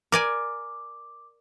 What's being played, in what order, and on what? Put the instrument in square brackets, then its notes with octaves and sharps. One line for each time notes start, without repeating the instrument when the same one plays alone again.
[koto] A#4 D5 G#5 [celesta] D6